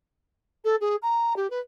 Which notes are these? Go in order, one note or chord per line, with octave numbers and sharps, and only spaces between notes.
A4
G#4
A#5
G4
B4